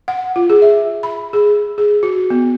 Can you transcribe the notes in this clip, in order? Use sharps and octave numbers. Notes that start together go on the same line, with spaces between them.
F#5
F4
G#4
E5
B5
G#4
G#4
F#4
B3